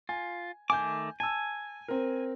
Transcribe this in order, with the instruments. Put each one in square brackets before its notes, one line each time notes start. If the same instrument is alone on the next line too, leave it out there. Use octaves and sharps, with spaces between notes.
[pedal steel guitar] F4 [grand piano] G#5
[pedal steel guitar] D#3 A3 D6 [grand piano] G#5 G6
[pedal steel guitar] G#5 [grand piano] A5 E6
[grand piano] C4 A#4